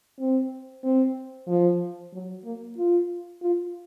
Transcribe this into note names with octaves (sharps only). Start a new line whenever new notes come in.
C4
C4
F3
F#3
A#3
F4
F4